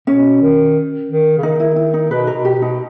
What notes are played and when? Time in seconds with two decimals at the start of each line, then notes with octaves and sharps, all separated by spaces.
0.07 B2 C#4
0.42 D#3
1.09 D#3
1.38 C#3
1.43 D#3 D#4
1.60 E4
1.76 E4
1.94 D#4
2.10 B2 B4
2.27 A#4
2.33 B2
2.45 G4
2.56 B2
2.62 D#4